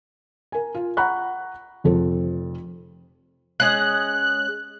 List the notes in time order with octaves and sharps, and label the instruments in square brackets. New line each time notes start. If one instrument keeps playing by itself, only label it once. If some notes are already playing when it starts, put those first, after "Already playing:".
[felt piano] A#4 G#5
F4
F#5 A#5 B5 C#6 F#6
F1 F2 A4 C5
[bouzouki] G#3 C#4 D#5 [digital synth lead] F#6